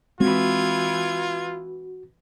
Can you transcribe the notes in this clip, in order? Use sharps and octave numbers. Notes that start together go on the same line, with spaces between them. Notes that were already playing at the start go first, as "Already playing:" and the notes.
E3 G#3 C4 F4 F#4 B4 G#6